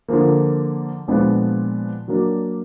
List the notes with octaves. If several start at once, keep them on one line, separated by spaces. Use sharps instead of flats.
D3 F3 A#3
A#2 F3 G#3 B3 D4
F#3 A#3 D4 F#4